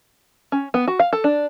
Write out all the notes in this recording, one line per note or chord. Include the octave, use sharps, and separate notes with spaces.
C#4
B3
F#4
F5
A4
D4